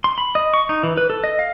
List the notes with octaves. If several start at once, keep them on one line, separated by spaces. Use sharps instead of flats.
C6
B5
D#5
C#6
D#4
E3
B4
A4
D#5
F5